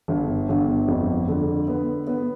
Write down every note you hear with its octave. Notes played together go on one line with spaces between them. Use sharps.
G1
G1
F2
D3
B3
B3